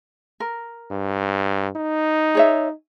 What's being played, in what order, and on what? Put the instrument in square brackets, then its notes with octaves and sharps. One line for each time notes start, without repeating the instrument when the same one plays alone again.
[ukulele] A#4
[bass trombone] G2
D#4
[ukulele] G#4 C#5 E5